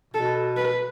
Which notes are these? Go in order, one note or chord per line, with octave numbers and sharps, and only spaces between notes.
B2 A4
B4